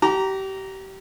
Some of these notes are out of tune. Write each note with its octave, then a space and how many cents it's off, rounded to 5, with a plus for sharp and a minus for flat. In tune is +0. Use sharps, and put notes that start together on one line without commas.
G4 -30 A#5 +0